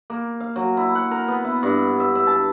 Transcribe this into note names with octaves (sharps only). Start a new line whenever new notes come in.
A#3
F5
F#3
E4
F#5
A#4
B3
E4
G2
E5
E5
A5